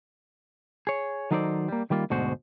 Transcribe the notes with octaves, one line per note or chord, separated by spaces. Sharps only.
G#4 C#5
D#3 F#3 D#4 A4 C5 D5
G3 A#3
D#3 G3 A#3 F4
D2 G#2 B2 D3 F#4 C5